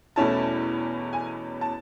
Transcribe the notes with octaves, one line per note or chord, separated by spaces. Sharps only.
E2 B2 A3 C#4 E4 A5
G#5
A5